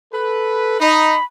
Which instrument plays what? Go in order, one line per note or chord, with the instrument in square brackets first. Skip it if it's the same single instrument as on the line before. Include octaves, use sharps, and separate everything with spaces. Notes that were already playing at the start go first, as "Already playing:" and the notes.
[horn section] A4 B4
[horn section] D#4 [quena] B5